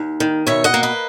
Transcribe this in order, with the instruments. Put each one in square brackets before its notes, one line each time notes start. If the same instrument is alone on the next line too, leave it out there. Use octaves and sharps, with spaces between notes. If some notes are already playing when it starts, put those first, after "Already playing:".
Already playing: [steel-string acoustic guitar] D#2
D#3
B2 C#5 E5
D#5 F#5
A#3
B4 D#5